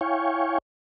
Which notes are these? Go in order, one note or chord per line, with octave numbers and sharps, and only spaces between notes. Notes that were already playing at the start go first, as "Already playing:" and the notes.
E4 C#5 F5 G5 G#5 C#6